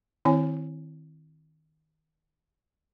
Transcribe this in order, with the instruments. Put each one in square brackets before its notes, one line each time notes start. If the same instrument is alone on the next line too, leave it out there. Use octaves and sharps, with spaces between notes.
[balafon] D#3 C4 E4 C#5 G#5